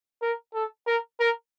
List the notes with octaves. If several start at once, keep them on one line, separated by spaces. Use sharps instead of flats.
A#4
A4
A#4
A#4